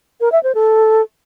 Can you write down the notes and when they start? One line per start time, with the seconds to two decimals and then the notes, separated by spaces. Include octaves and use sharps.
0.21 A#4
0.32 E5
0.43 C5
0.55 A4